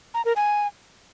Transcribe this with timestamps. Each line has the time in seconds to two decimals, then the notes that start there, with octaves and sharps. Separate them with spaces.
0.14 A#5
0.25 A#4
0.36 G#5